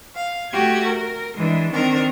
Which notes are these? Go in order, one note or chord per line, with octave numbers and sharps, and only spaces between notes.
F5
A3 F#4 G4 G#6
A#4
E3 G#3 D4
D#3 C4 D4 A#4